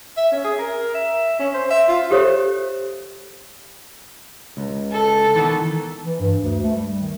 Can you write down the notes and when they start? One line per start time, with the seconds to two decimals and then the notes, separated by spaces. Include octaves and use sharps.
0.17 E5
0.32 C#4
0.44 G#4
0.58 A#4
0.94 E5
1.39 C#4
1.54 C5
1.70 E5
1.89 F4
2.11 G4 A4 C5 C#5 E5
4.57 C#2
4.92 A4
5.36 D#3 E3 B3
6.05 E3
6.20 G2
6.42 D2
6.63 A3
6.75 G3
6.98 D#3